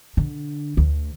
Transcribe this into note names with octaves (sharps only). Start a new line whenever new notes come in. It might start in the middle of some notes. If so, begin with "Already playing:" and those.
D3
D2